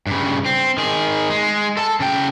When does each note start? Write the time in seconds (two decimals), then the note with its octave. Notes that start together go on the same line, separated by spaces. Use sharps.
0.07 G2 C#3
0.45 C4
0.78 D#3 G#4
1.30 G#3
1.77 A4 A5
2.00 C#3 G5